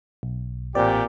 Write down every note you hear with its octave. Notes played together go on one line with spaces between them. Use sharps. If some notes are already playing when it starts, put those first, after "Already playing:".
B1
A1 A#2 C4 G4 D5